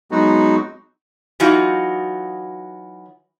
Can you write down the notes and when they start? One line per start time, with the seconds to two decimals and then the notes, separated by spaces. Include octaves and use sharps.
0.11 F#3 G#3 B3 D#4 F#4
1.40 E3 F#3 D#4 F4 F#4